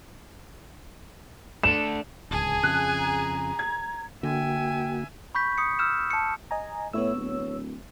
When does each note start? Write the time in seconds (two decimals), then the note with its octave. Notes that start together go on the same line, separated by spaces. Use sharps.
1.63 A3 D4 A4 E7
2.31 D1 C#2 G#4 G#5 A5
2.63 F2 C#3 F#6
2.99 A#5
3.59 G#6
4.23 D3 A#3 F#4 E5 G5 G#5
5.35 B5 C#6 G6 B6
5.58 D#6 C#7
5.79 E6 F6 G6 E7
6.10 A5 C#7
6.51 D#5 G#5 A#5
6.93 A2 B3 C#5 E6
7.15 D1